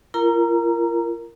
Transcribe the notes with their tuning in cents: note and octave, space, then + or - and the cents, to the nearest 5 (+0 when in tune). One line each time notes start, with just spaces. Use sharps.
F4 -40 A#4 +0 A#5 +0